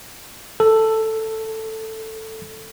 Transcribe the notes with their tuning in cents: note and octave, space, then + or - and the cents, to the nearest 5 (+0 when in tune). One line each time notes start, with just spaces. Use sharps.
A4 +5